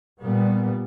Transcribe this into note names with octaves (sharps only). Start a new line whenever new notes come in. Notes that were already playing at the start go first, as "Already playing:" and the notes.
A#2 G3 B3